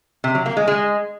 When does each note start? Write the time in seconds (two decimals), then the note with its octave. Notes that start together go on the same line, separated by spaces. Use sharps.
0.24 C3
0.35 F#3
0.46 A#3
0.57 G#3
0.68 G#3